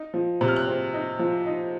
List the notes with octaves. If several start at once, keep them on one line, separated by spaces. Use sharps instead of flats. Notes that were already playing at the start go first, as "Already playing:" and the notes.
Already playing: D#4
F3
C3 F#6
F6
F#6
C4
D#4
F3
D#4